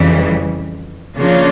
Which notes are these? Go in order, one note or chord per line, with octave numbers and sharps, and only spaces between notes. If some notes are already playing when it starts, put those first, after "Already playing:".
Already playing: F2 C#3 E3 G3
C#3 F3 A#3 D4 F4